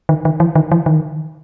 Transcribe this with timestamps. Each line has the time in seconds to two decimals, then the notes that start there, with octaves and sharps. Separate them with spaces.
0.09 D#3
0.25 D#3
0.40 E3
0.55 D#3
0.72 E3
0.86 D#3